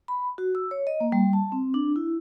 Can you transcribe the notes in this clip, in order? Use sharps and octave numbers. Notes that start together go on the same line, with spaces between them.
B5
F#4
E6
C#5
D#5
A#3
G3
A5
C4
D4
E4